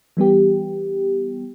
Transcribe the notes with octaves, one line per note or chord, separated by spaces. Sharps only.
E3 G3 B3 G4